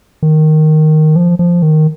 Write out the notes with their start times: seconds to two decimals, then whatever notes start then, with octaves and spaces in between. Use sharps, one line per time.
0.23 D#3
1.16 F3
1.39 F3
1.62 D#3